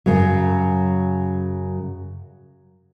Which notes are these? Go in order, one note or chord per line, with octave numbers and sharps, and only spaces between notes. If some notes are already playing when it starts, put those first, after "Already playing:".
F#2 C#3 F#3